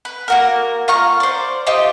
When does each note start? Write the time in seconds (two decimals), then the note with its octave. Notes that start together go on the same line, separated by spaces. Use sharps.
0.05 B4
0.28 A#3 F#4 A#4
0.88 F4 A#5 C#6 F6
1.20 C5 D5
1.67 D#4 F4 G4 C5